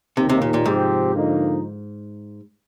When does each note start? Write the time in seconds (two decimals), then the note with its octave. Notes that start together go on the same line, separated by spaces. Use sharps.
0.17 D#2 C3 D#3 A#3
0.29 C3
0.42 A#2
0.54 A#2
0.65 G#2 C3 F3 C4 G4
1.14 D3 F3 A#3 D#4